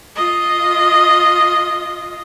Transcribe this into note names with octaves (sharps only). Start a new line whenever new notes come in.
F4 D#5